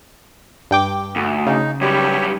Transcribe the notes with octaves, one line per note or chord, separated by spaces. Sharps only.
G2 G5 D6
D2
C#3 D#4
F#2 G3 G4 C#5